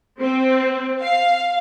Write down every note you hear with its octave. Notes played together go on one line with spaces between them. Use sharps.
C4
F5